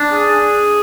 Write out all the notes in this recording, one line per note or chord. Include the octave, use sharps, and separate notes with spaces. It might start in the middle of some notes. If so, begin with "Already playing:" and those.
Already playing: D4
G#4